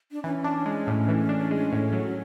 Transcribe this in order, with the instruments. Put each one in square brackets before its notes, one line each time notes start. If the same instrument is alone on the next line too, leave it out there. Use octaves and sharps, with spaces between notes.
[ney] D4
[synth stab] E3 [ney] C#4
[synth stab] D4
G#3
A2
E3
D4
G#3
A2
F#3